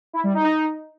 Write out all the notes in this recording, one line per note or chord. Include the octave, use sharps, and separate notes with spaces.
E4
G3
D#4
D#4